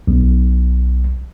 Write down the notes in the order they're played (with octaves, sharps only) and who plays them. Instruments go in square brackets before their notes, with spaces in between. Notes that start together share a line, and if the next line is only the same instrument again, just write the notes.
[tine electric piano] B1